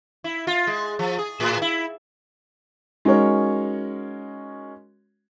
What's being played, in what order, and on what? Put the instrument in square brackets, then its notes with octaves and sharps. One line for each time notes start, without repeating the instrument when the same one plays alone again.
[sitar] E4
F4
G#3
F3
G#4
A2
E4
[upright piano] G#3 C#4 D#4 F#4 A#4 C#5